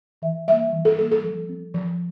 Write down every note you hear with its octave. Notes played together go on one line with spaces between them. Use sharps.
E3 E5
G3 A#3 E5
E3
A4
G3 A#3 A4
A4
F3
C4
F3